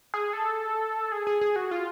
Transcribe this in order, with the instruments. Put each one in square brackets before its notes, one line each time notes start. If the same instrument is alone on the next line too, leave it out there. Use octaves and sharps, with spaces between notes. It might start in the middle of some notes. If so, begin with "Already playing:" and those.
[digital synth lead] G#4
A4
G#4
G#4
G#4
F#4
F4